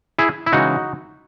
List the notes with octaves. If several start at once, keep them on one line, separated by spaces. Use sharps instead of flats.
E4 G#4
E4
C#3 E3 G#3 D#4 F#4